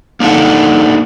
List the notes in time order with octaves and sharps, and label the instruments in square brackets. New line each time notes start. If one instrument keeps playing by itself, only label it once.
[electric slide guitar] A#3 D4 D#4 A4 F#5